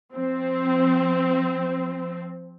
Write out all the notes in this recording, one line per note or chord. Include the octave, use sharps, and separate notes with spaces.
F3 C4